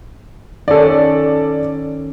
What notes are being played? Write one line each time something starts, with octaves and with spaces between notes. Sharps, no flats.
D#3 C#4 A4 D5